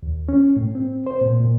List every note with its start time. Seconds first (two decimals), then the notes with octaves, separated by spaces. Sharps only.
0.03 D#2
0.29 C#4
0.56 A2
0.75 C4
1.06 C5
1.21 A#2
1.40 A#2